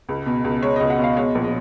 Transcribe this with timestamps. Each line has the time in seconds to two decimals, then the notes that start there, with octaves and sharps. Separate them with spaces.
0.09 C#2
0.26 B2
0.44 C#2
0.63 G#3 C#5
0.76 C#2 D#5
0.90 F#5
0.98 B2
1.04 F5
1.17 G#3 C#5
1.35 A#1
1.44 D#5